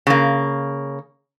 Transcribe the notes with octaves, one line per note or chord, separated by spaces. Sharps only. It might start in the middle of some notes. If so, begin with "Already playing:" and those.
C#3 A#3